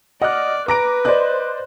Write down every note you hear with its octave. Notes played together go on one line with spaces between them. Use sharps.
D5 D#5 F#5 F6 F#6
B4 A#5 D6 A#6 D7
C5 D5 D#5 F#6